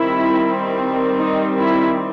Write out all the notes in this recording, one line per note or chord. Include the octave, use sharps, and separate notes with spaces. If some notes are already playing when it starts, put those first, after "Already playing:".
Already playing: D#3 G3 C4 E4
D#4
E4